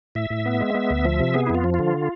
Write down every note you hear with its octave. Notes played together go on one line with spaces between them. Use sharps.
A2 E5
A2
B3
G#3
B3
D2
F3
C3
B3 G#4
F2 E4
F4
F3
D3 F4